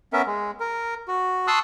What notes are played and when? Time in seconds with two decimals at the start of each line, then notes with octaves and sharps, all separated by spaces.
0.13 B3 C#4 A#4 E5
0.27 G#3
0.60 A#4
1.08 F#4
1.48 A5 C6 C#6 D#6 E6 F#6